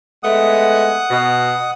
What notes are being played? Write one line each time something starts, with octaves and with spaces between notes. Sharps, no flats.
G#3 A3 B3 F#5 D#6
B2